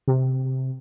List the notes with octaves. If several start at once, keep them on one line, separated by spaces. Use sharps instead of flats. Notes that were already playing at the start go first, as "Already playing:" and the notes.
C3